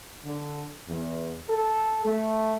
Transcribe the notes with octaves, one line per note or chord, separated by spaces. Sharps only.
D3
E2
A4
A3